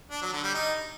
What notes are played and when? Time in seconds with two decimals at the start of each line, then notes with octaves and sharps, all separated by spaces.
0.10 D4
0.21 F#3
0.32 D3
0.43 G3
0.54 D#4